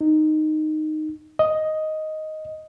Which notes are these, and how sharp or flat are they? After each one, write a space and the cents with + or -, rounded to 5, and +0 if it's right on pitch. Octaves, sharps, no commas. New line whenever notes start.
D#4 -10
D#5 +5